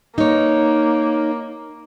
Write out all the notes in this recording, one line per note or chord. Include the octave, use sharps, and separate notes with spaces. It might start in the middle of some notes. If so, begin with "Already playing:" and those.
A#3 D#4 C#5